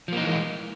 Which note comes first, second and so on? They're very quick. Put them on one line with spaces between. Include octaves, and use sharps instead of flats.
F3 A#3 D#4 E3 G#3